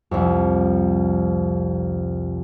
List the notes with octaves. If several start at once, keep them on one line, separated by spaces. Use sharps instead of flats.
C2 F2